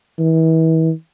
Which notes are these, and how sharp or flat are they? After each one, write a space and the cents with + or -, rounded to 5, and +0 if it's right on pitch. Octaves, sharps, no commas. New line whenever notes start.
E3 -35